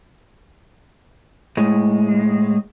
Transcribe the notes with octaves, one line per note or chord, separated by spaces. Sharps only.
A2 G#3